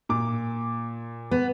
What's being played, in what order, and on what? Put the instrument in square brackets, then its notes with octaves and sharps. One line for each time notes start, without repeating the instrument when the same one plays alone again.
[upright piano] A#2 D6
[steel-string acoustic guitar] B3